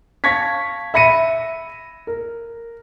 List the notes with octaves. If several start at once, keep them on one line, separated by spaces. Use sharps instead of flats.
F5 A5 C#6 G#6 A#6 B6
E5 B5 A#6 C#7 D#7
A#4